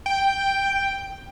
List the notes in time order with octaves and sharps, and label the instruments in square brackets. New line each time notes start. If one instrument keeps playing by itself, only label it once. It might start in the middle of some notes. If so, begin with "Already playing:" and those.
[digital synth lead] G5